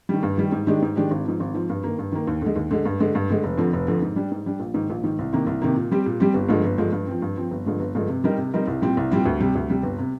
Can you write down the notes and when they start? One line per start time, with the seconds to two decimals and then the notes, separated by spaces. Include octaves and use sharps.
0.09 D#3 G3
0.23 G2
0.37 D#3 G3
0.52 G#2
0.67 D#3 G#3 D4 G4
0.82 G#2
0.96 D#3 G#3 D4 G4
1.11 G#1
1.25 G#2 F3
1.40 G#1
1.54 G#2 F3
1.70 G2
1.84 D#3 A#3
1.99 G2
2.12 D#3 A#3
2.27 D#2
2.42 D3 G#3
2.56 D#2
2.71 D3 G#3
2.85 G2
3.00 D3 G#3
3.15 G2
3.30 D3 G#3
3.44 F1
3.58 F2 D3 F3
3.73 F1
3.87 F2 D3 F3
4.02 G#2
4.16 G3 D4
4.31 G#2
4.46 G3 D4
4.60 A#1
4.74 G#2 D#3
4.90 A#1
5.03 G#2 D#3
5.19 C2
5.33 C3 D#3 A#3
5.47 C2
5.62 C3 D#3 A#3
5.76 A#2
5.91 G3 C4 G4
6.06 A#2
6.20 G3 C4 G4
6.34 G1
6.49 G2 D3 F3 G#3
6.64 G1
6.78 G2 D3 F3 G#3
6.92 G2
7.07 F3 C4
7.22 G2
7.37 F3 C4
7.51 G1
7.66 G2 D3 F3 G#3
7.80 G1
7.95 G2 D3 F3 G#3
8.09 C3
8.24 G3 C4 D#4 A#4
8.38 C3
8.54 G3 C4 D#4 A#4
8.67 C2
8.82 A#2 G3 C4
8.97 C2
9.12 A#2 G3 C4
9.25 D2
9.40 C3 G3
9.55 D2
9.70 C3 G3
9.83 G1
9.99 C3